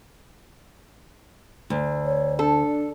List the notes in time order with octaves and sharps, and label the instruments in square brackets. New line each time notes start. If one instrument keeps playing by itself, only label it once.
[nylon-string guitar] D2
[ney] C#5
[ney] D4 [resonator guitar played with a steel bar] A4